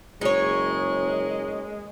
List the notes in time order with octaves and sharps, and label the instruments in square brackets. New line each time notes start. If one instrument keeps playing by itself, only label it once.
[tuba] F#1 [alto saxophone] G#3 [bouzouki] D#4 C#5